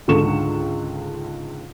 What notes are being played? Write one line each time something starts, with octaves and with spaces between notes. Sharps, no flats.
C#2 G#2 D3 A4 C#6 E7